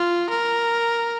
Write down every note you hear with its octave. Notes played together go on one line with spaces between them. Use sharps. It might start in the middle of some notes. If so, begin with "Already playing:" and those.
Already playing: F4
A#4